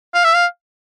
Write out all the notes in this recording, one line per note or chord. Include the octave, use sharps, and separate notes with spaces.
F5
E5
F5